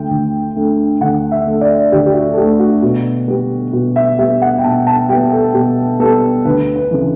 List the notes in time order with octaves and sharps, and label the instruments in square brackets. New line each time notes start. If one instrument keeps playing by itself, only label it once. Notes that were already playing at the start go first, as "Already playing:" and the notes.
Already playing: [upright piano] D2 D3 A3 G5
D2
D3 A3
D2 F#5
E5
D3 A3
D5
D2 G4
G4
F#4
A4
D3 A3 G4
F#4
B2 F#4
G3 B3
B2 F#4
E5
G3 B3 E5
F#5
G5
B2 A5
A5
G3 B3 G5
A4
B2 G4
G3 B3 A4
D2 B4
B4
C#3 E3